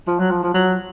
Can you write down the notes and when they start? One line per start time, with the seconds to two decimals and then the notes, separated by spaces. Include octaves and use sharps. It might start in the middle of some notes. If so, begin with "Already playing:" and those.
0.08 F3
0.19 F#3
0.31 F3
0.43 F3
0.54 F#3